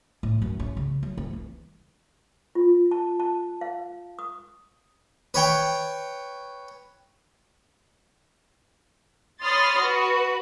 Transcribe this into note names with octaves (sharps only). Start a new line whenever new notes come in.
A2
F#2
C#4
C#3
F#3
C4
E3
F4
A5
A5
F5
D#6
B4 C#5 G5
C#5 B5 C6 D#6 F6 A6
F#4 B4